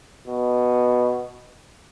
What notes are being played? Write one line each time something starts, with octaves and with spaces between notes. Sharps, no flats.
B2